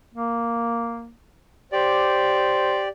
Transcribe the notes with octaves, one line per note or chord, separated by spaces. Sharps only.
A#3
G4 C5 D5